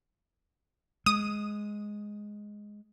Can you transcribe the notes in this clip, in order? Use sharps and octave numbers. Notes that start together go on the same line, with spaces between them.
G#3 D#6